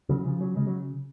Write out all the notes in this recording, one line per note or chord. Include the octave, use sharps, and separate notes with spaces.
C#3 F#3
C#3 F3
C#3 F#3
C#3 G#3
F#3